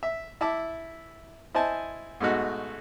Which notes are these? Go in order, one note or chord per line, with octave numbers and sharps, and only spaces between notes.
E5
E4 E5 A5 D6
E4 C5 D#5 G#5 A5
G#2 B2 A3 D#4 F#4